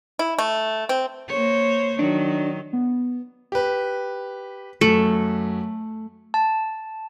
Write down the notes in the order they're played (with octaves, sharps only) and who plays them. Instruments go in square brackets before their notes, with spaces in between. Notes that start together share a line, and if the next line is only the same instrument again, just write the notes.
[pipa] E4
A3
C4
[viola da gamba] A#3 C5 C#5
[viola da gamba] D#3 F#3 [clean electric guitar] D4
[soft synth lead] B3
[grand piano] G4 B4
[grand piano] F#2 F#7 [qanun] A3
[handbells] A5